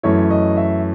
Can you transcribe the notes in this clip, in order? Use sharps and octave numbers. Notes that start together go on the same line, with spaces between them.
F#2 E3 A3 E4 C#5
D#5
E5